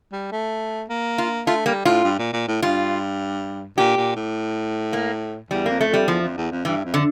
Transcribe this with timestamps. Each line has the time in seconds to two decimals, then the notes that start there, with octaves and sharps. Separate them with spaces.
0.12 G3
0.32 A3
0.89 A#3
1.18 F4
1.47 A3 F4
1.66 G3 A#3
1.85 A2 F4
2.04 G2
2.19 A#2
2.33 A#2
2.48 A2
2.62 G2 F4
3.77 A#2 G4
3.97 A#2
4.16 A2
4.93 A#3
5.50 E2 G3
5.66 F2 A#3
5.81 A3
5.88 F2
5.93 G3
6.08 E2 F3
6.22 F2
6.37 E2
6.51 F2
6.65 G2 E3
6.85 F2
6.94 D3